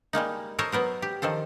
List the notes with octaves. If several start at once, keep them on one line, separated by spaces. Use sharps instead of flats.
G3 G#3 A#3 D#4
A4 A#4 C5 C#5 D#5
F#3 B3 A#4 C5
G4
D#3 F3 A4 C5